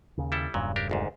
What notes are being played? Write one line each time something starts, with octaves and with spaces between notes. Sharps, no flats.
D#2 C#3
G3 E4 A4
E1 G2 A#2 C#3 F#3
D4 G4 A#4
G#1 D2 G#2